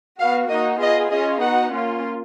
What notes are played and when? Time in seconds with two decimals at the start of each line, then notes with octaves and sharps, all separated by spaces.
0.18 B3 F#4 F5
0.49 A#3 D#4 F#4 D#5
0.80 B3 F4 G#4 D#5
1.11 C#4 F4 G#4 D#5
1.41 B3 D#4 F#4 F#5
1.72 A#3 C#4 F4